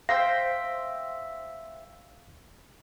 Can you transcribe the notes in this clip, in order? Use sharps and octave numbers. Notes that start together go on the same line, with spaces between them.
C5 E5 F5 G5 A#6